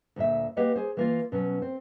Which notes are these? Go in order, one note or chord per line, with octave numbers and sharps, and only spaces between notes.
D2 A#2 E5
A#3 G4 B4 D#5 F#5
G#4 C5
E3 A#3 F4
B2 F#3 C#4
C4 C5